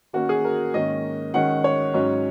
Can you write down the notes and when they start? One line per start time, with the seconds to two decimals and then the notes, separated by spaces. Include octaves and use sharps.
0.13 D#3 A#3 C#4 F#4
0.29 G#4
0.45 A#4
0.74 G#2 D#3 A#3 C#4 D#5
1.34 D#3 G#3 C#4 F#5
1.64 C#5
1.94 G#2 F#3 C#4